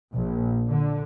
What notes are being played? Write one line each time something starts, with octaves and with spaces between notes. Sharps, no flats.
A#1
D3